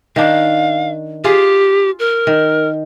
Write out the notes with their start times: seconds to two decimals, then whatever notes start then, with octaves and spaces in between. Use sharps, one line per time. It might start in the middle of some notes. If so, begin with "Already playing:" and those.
0.16 D#3 D4 F5
1.24 F4 G4 G#4
1.99 A#4
2.27 D#3